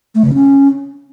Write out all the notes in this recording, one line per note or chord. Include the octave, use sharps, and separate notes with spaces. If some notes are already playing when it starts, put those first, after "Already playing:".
A3
C#3
C#4